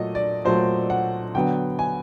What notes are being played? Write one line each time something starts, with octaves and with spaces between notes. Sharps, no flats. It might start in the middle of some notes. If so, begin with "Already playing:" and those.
Already playing: A#2 F#3 A3 D#5
D5
A#2 F#3 A3 C5
F#5
D3 F#3 B3 G5
G#5